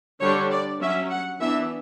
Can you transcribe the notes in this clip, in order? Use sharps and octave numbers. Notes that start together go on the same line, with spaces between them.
D3 G3 D4 C#5
D5
F#3 C#4 E5
F#5
E3 B3 D4 E5